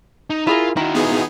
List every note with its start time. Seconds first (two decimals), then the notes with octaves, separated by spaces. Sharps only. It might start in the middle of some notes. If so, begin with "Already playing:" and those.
0.30 D#4
0.47 E4 F4 G#4 A#4
0.77 D#3 E4 F#4
0.95 B3 D#4 G#4